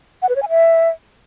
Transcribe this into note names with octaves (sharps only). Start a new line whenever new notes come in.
F#5
B4
C#5
G#5
E5